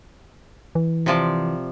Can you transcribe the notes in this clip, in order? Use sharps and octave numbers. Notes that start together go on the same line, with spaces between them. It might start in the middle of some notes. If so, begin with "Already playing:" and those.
E3
C3 F3 D5